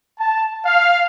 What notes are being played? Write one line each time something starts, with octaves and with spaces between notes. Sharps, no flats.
A5
F5